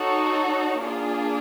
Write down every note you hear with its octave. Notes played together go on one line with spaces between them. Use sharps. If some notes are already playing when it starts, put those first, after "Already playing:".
Already playing: D#4 F#4 A4 C#5
A#3 D4 F4 G#4